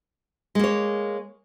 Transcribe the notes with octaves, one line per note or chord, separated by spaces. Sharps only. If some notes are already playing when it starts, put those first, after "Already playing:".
G#3 A#3 C#5